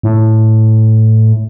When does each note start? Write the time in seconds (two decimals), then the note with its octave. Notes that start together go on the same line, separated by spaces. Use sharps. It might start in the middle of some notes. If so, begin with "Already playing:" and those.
0.03 A2